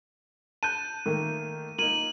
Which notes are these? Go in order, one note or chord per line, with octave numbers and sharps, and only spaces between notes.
A5 F#6 G6 D#7
D#3 A3 A#3
A#3 D#4 D#7 F#7